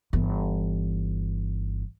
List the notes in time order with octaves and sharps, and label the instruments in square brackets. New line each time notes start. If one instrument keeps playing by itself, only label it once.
[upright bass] G1 E3